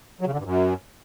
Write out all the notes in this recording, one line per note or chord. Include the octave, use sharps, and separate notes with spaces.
F#3
C#3
D3
G2
F#2